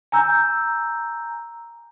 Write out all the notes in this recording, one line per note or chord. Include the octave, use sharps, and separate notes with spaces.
G#5 A#5 E6 G6